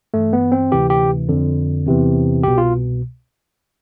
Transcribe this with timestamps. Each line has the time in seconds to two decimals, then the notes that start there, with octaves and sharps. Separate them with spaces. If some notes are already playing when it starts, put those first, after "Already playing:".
0.14 G2 E3 A3
0.33 B3
0.52 C4
0.72 D2 C3 E3 G4
0.90 G4
1.28 F2 D3
1.86 E2 C3 E3
2.43 C2 B2 G4
2.58 F4